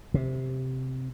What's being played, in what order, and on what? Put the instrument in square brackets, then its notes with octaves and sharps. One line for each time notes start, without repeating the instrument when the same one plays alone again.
[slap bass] C3